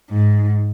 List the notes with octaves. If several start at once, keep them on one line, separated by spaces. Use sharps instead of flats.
G#2